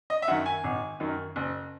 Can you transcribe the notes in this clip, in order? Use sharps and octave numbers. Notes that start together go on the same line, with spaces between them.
D#5
E5
F#2 D#3 F#5
G#5
G#1
F#2 D#3
F#1